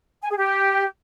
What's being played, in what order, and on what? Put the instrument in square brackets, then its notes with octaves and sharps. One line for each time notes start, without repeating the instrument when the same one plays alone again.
[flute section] G#5
G#4
G4